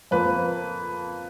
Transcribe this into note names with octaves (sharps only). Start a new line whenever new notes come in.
F2 F3 A#3 B4